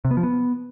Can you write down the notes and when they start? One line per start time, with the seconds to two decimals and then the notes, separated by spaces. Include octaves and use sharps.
0.05 C3
0.11 B3
0.17 F3
0.23 B3